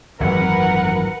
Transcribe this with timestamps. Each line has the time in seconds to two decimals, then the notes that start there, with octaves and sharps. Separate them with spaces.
0.20 G#1 F#2 E3 A#4 B4 F#5